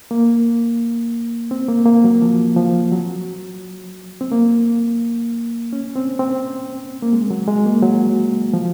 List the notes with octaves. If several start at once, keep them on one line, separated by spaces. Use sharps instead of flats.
A#3
C4
A#3
A#3
F#3
F3
F3
F#3
C4
A#3
C#4
C4
C4
A#3
G#3
F#3
G#3
A#3
F#3
F3